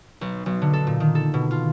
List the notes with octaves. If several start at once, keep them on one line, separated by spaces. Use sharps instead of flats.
B1
B1
D3
A4
A#2
D#3
A4
B2
F4